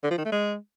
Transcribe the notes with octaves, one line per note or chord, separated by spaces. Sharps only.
D3
F3
D#3
A3
G#3